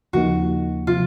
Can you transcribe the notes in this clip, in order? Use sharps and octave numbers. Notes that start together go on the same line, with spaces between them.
D#2 C#3 F3 A#3 D#4 F#4
C3 F3 F4